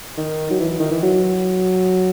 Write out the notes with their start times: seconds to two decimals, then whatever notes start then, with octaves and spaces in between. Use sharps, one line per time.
0.17 D#3
0.51 F#3
0.60 E3
0.79 D#3
0.91 E3
1.03 F#3